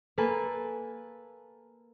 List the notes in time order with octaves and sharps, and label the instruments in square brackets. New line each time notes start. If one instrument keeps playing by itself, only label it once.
[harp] A#3 A4 B4 G#5